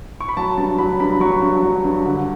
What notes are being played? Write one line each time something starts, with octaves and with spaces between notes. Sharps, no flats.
C#6
B5
F#3 A5
G2 A5
F#3 B5
G2 B5
F#3 C#6
G2
F#3
G2
D3